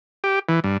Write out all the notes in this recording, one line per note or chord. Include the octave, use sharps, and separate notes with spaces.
G4
E3
G2